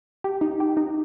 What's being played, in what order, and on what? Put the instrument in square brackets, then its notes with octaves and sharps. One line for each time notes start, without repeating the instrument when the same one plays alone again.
[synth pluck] G4
D#4
G4
D#4